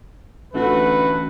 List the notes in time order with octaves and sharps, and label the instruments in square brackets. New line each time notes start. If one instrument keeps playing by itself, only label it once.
[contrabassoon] A1 [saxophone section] D3 A3 F#4 [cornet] B4